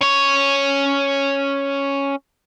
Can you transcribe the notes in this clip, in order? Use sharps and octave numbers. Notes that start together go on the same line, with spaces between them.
C#4 C#5